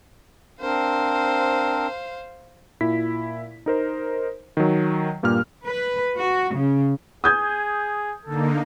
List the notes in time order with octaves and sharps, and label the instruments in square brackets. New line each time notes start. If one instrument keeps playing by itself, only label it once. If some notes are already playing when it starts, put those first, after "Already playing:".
[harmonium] C4 D4 A#4 [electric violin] C5 F5
[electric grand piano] A#2 E4 B6
D#4 A#4 C5
D#3 F#3
G2 A#2 A#3 G4 F6
[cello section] B4
F#4
C#3
[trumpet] G#4 [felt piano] D#6 G6 G#6
[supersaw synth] D3 A#3 D#4 [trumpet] A4